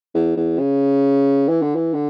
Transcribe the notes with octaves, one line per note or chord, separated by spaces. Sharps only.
E2
E2
C#3
E3
D3
E3
D3